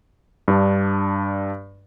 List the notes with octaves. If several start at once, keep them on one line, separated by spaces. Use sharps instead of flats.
G2 D4